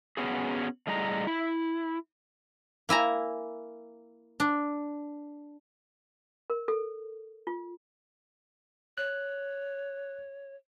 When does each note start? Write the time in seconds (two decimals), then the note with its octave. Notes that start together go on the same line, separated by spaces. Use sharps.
0.17 B3 C#4 F#4 G#4
0.87 A2 G3 G#4 D#5 A#5
1.27 E4
2.89 A#3 E4 G#5 A#5
4.40 D4
6.50 A#4
6.68 A4
7.47 F4
8.98 C#5 F#6